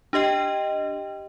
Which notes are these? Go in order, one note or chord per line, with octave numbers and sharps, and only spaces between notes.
D4 G4 D#5 G5